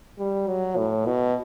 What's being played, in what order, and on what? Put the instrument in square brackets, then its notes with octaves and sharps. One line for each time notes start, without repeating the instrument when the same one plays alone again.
[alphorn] G3
F#3
A2
B2